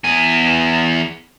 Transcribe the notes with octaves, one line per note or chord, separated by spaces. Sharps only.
E2 G#5